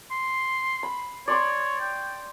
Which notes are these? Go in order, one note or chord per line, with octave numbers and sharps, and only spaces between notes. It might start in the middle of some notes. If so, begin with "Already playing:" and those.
C6
B5
C#5 D5 C6 D6
G5